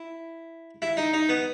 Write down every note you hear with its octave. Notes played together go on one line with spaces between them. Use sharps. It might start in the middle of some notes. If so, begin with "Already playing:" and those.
Already playing: E4
E4
D#4
D#4
B3